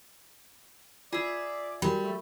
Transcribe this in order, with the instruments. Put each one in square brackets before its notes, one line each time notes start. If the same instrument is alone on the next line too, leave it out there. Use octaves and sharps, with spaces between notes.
[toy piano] F4 [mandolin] G#4 E5 [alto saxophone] D5
[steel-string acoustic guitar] G3 [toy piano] F#4 A#4 B5
[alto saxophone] A3